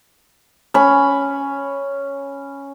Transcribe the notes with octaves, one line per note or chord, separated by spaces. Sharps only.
C#4 B5